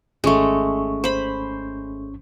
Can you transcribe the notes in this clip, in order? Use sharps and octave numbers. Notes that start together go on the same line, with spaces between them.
G#1 G#3 A3 C#4 C#6
C5 B5